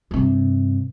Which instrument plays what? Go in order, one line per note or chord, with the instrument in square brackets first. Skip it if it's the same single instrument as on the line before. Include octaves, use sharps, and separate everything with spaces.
[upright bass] G2 C3